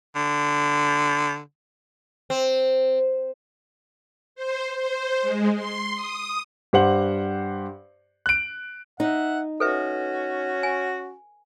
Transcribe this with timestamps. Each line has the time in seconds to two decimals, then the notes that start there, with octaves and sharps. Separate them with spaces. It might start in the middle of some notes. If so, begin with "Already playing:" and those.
0.16 D3
2.30 C4
4.36 C5
4.77 C5
5.22 G#3
5.55 C6
5.95 D#6
6.73 G2 G4 C5 F#5 F#7
8.26 F#6 D7
9.00 D#4 E5 F#5
9.60 C#4 F#4 A4 B4 E5
10.63 G#5